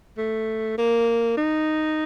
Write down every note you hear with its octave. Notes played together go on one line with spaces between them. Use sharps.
A3
A#3
D#4